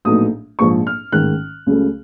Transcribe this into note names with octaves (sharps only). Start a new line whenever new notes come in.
A#1 A2 F#3 B3 D#4 D#6
A#1 G#2 F3 C#6
F6
A1 G#2 D#3 F#6
C#2 C#3 F#3 A3